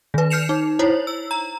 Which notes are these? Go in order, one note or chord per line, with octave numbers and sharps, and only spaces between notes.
D#3 B4
F6 G6 C7 C#7 E7 F7
D#4
E4 C5 C#5
E6
A#5